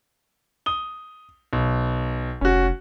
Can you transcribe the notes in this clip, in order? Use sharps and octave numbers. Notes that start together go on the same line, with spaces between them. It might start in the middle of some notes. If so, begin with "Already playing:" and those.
D#6 G7
B1
F1 C#4 F#4